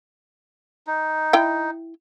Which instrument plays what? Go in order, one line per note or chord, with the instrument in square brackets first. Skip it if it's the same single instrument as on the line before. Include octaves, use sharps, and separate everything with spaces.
[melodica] D#4
[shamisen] E4 G5